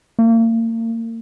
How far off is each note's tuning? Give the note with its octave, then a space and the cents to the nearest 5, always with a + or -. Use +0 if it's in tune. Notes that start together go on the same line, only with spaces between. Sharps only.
A#3 -40